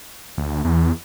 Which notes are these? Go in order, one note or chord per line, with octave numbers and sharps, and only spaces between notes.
D2
E2